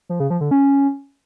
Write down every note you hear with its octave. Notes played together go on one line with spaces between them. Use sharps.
F3
C#3
F3
D3
C#4